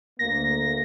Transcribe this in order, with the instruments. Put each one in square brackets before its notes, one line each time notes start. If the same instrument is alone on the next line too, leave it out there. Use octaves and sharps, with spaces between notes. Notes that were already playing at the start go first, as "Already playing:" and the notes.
[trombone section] D2 A#3 [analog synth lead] A#6